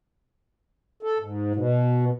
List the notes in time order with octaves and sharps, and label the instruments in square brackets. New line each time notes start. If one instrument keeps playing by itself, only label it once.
[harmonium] A4
G#2
B2